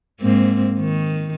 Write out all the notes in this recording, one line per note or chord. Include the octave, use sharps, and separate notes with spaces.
G#2 A#3 C4
D#3